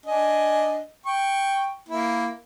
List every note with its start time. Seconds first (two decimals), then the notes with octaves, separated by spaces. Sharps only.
0.06 D4 D#5 G#5
1.06 G5 C#6
1.89 A#3 E4